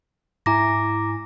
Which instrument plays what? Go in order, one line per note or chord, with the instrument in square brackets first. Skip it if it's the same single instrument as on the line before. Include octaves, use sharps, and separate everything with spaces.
[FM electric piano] G#2 E4 G#5 [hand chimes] A#5 D6 A#6